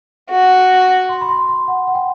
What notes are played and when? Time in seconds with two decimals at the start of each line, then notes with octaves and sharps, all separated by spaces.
0.30 F#4
1.09 C6
1.21 B5
1.29 C6
1.49 C6
1.68 F#5
1.87 F#5
1.95 G5